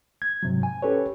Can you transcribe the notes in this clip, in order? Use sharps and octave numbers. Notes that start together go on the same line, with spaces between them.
G#6
G#2 C3 F#3
G#5
C#4 G4 A4 B4 C#5